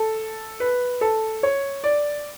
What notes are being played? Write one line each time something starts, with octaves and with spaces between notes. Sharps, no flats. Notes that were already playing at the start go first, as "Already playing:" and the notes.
Already playing: A4
B4
A4
C#5
D5